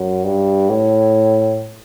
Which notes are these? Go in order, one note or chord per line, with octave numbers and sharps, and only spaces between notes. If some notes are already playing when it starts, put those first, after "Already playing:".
Already playing: F#2
G2
A2